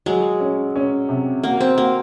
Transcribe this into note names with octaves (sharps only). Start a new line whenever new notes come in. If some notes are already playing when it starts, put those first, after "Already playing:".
F#3 G#3
C#4
C#4
C3
A#3 F#4
C4
A#3 F#4